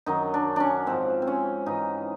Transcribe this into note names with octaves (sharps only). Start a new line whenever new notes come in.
F#2 D#3 F#3 D#4
D4
C#4 D4
G#2 F3 C4
C4
C#4
G#2 E3 D#4